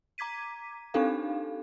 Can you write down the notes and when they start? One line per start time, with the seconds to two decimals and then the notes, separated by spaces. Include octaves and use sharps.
0.18 A#5 D6 G#6 B6 D#7
0.94 C4 D4 D#4 G4 A4 F5